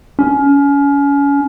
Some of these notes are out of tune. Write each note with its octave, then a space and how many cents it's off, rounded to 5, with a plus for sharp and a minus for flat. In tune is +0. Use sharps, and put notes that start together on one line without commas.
C#4 +30